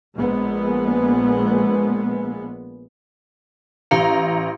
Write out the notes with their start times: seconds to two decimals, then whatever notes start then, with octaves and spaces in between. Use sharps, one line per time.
0.16 A#1 G#3 B3
3.91 A1 G4 F5 A#5 C#7